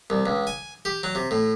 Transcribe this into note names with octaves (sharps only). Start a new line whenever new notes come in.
C2
C#2
G#5
G4
F#3
C3
A2